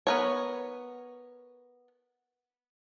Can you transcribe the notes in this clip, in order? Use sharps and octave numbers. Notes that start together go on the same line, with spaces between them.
B3 A#4 C#5